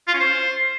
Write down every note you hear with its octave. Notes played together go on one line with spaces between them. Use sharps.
F4
C#4
C5